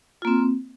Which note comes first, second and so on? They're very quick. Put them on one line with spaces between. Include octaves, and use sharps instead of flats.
F4 A#3 C4